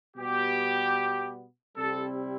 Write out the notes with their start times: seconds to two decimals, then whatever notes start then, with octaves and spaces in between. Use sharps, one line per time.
0.17 B2 G3 B3 G4
1.77 C3 G3 C4 E4 A4